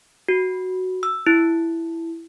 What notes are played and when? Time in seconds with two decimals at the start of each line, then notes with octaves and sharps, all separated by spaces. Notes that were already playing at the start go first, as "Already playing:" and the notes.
0.28 F#4
1.03 E6
1.27 E4